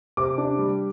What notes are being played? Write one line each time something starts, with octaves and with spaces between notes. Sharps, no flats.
C3 D6
D4
G3